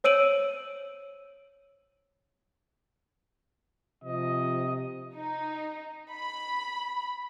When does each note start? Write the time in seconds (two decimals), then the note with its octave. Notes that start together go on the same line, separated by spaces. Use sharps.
0.04 C5 C#5 E6 D7 D#7 F#7
4.04 C3 F3 D#5
5.15 D#4
6.11 B5